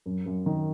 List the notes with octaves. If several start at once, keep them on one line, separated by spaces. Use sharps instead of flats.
F#2
F#2
D#3